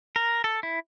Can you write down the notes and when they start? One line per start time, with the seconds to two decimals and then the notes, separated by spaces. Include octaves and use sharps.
0.16 A#4
0.44 A4
0.63 E4